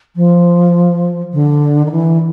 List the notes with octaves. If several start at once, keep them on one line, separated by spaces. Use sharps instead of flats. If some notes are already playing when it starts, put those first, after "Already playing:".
F3
D3
D#3
E3